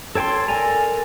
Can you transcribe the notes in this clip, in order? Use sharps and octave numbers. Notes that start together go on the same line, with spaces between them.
A4 C#5 G5 A5 C6
A4 A#4 D5 G#5 A#5